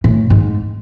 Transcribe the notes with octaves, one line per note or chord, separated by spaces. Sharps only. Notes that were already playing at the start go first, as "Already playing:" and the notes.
A2
G#2